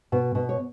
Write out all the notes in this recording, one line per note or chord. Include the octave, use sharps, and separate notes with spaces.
B2
B2
C#5